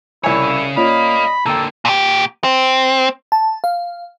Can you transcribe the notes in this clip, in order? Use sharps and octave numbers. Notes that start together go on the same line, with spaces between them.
C2 C#3 E4 C#5 G#5
A#2 C#4 A#4 D#5 F5 B5
D3 A#3 A4 G5 A#5
A#2 G4
C4
A5
F5